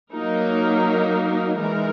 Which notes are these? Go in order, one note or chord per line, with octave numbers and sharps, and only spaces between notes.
F#3 A#3 D#4 A#4
E3 G#3 D#4 A#4